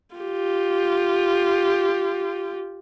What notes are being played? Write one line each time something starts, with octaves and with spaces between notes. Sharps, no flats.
F4 G4